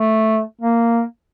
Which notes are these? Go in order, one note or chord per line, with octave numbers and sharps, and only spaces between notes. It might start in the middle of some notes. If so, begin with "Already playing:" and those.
Already playing: A3
A#3